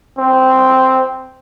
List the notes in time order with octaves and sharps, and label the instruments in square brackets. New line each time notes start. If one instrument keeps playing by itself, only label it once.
[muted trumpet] C4